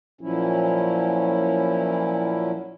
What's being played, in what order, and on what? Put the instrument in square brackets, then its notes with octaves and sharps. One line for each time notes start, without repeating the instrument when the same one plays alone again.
[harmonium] A#2 F3 F#3 C#4 E4